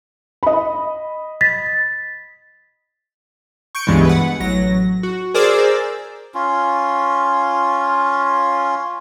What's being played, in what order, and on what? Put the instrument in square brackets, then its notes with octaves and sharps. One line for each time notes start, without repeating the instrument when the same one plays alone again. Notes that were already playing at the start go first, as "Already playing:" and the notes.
[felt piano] D#5 B5
[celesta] A6 B6
[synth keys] C#6 G6 C#7 D7
C#2 G2 E3 G#3 B3
B4 F#5
A1 F#3 A#6
F#4
G#4 A#4 C5 D5 D6 E6
[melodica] C#4 F4